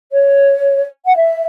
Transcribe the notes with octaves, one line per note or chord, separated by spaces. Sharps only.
C#5
F#5
E5